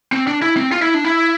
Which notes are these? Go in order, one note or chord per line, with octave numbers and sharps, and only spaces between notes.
C4
D4
E4
C4
F4
E4
D4
E4